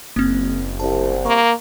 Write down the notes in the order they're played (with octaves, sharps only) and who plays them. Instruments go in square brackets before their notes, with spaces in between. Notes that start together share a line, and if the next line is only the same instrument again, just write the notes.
[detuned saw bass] F#1 [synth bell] A#3 C4
[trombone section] C2 [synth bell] A5
[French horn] A#3 [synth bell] C#6